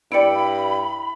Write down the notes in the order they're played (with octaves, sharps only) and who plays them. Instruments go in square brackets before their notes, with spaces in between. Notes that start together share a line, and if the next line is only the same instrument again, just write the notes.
[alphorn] G2 [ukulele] E4 D5 [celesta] G5 C#7 D7 [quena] B5